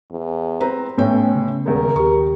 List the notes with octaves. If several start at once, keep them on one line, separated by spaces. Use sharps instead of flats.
E2
C4 B4 A#5
A1 A2 B3 C#4 C#5 G5
C#3
D#1 E2 A#4
D#2 G4 C#6